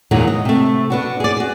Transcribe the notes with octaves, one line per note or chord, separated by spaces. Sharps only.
E2 A#2 D#3 F#3 G#3 D#4
D#5
C3 A3
B3 D4 F#4
G#4 D5
F#4 G#4